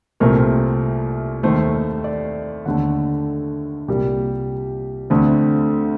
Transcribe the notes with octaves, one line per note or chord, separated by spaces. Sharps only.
C2 A#2 A3 C4 A#4
D#2 D#3 A3 C5
D5
D#2 D3 A3 F#5
C2 A#2 G3 A#3 G4
D2 D3 A3 C4